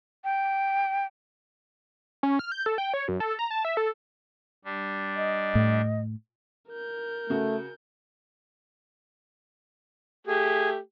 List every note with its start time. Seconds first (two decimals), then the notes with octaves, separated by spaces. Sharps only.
0.24 G5
2.23 C#4
2.39 F6
2.52 G6
2.66 A4
2.78 G5
2.93 C#5
3.08 F#2
3.20 A4
3.39 A#5
3.50 A5
3.65 E5
3.77 A4
4.65 G3 D4
5.16 D#5
5.55 A2
6.69 A#4 G6
7.30 C#3 A3 F#4
10.27 A3 G4 G#4